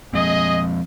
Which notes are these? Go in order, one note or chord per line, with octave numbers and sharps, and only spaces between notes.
F3 G#3 C4 G#4 D#5